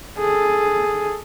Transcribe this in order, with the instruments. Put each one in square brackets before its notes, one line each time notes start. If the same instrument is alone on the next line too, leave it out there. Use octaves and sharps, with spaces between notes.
[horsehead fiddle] G#4 A4